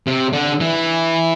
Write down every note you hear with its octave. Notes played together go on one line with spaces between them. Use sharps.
C3
D3
E3